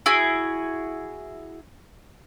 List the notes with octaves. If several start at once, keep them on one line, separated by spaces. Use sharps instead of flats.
E4 F#4 G#4